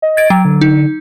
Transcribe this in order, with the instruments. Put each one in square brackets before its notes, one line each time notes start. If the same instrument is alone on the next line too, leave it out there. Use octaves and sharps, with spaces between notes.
[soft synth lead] D#5
[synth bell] G#6 A6 D7
[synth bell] F#3 [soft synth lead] G5
[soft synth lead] D3
[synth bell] D#4